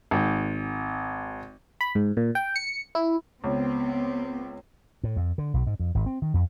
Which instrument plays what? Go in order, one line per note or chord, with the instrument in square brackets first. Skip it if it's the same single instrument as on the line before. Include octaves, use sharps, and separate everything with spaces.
[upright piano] G#1
[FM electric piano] B5
G#2
A#2
G5
C#7
E4
[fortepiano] C#2 [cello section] B3 C4
[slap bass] A2
F2
D3
B1
G#2
F2
G#1
C4
D#3
F2